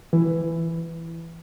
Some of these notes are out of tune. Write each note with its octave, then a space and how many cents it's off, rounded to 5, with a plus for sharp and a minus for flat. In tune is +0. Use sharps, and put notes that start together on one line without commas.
E3 +10